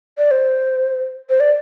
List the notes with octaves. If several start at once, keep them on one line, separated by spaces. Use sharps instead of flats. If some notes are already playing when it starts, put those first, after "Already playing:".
D5
C5
C5
D5